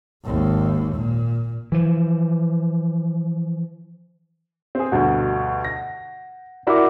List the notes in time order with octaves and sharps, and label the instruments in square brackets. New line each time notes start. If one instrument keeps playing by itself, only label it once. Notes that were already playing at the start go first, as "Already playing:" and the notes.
[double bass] G#1 D#2
A#2
[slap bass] E3 F3
[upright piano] C4 G#4
[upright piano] D2 G2 B2 [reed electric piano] F#5
[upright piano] A#6
[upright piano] E4 F#4 A#4 [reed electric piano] D5 E5 D6